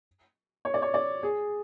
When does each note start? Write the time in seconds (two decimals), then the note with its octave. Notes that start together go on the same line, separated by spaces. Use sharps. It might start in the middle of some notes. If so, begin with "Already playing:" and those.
0.65 C#5
0.74 D5
0.82 C#5
0.94 D5
1.23 G#4